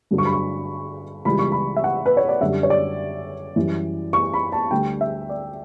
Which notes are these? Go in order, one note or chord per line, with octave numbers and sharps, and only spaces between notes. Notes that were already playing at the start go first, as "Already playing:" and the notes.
G2 D3 F#3
C#6
B5
C#6
C#2 C#3 E3 G3 B5
C#6
B5
E5
F#5
B4
C#5
D5
F#2 D3 G3 E5
C#5
D5
F#2 E3 G3
C#6
B5
A5
D2 D3 G3 G5
E5
D5